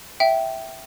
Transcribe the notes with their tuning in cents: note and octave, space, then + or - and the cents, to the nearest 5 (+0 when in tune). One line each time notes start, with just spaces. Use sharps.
E5 +0 G5 -15